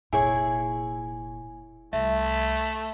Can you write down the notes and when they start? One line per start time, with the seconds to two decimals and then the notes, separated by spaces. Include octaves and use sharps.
0.13 F1 A#2 E4 G#4 C#5 G#5
1.93 C2 A3 E5